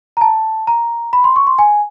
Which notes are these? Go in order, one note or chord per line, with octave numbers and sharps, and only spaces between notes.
A#5
A5
A#5
B5
C6
C#6
C6
G#5